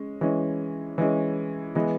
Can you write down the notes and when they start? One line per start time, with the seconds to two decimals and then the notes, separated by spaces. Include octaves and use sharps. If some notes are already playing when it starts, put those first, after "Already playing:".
Already playing: G#3 C#4
0.21 E3 G#3 C#4
0.98 E3 G#3 C#4
1.75 E3 G#3 B3